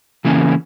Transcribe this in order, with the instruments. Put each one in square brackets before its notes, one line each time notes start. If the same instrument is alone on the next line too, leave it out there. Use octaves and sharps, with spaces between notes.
[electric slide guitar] C#3 E3 A#3 C#4